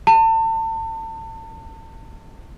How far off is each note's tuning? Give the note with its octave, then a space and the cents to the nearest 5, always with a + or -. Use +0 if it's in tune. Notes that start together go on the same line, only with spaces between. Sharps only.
A5 +35